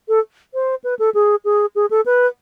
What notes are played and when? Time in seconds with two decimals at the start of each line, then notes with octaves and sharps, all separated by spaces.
0.08 A4
0.54 C5
0.84 B4
0.99 A4
1.14 G#4
1.45 G#4
1.75 G#4
1.90 A4
2.06 B4